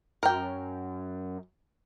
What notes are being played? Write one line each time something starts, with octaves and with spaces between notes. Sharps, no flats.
F#2 A#4 G5